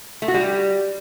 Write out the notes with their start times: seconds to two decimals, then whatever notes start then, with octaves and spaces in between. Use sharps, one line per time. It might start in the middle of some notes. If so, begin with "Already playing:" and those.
0.22 A3
0.28 F#4
0.34 G3